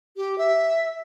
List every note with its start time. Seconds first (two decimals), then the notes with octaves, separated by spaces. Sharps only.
0.17 G4
0.38 E5